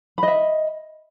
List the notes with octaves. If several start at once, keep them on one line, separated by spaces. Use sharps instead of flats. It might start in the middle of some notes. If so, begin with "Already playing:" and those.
D#5 E5 B5